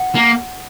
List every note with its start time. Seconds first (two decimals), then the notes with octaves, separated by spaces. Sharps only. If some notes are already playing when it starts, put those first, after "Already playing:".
Already playing: F#5
0.15 A#3